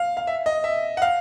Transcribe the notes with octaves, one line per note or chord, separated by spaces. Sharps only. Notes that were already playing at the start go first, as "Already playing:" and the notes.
Already playing: F5
F5
E5
D#5
E5
F#5
F5